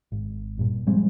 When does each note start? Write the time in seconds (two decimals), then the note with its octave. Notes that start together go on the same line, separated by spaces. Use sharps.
0.12 G#1
0.59 G2 A#2
0.87 F3 G3 G#3 C4